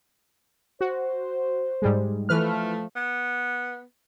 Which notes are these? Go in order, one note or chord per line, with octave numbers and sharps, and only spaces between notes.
F#4 C5
G#2 G3 G#3
E3 F3 A3 B4 F6
B3